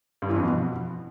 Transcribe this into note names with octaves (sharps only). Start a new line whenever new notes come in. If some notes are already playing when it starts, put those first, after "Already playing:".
G2
E3
F2
B2